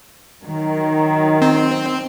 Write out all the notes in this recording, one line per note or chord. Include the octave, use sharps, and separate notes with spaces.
D#3 F#3
C4